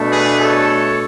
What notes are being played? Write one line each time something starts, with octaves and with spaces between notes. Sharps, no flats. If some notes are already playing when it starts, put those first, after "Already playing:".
Already playing: B2 A3 D4
G#4 B4
A4 C#5